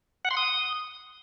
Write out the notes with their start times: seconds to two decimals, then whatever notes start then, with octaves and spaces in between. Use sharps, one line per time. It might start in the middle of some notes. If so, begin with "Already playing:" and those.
0.25 F#5
0.31 C6
0.37 D#6